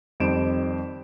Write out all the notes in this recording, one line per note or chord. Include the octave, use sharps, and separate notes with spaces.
F2 D#3 G3 C5 D7 E7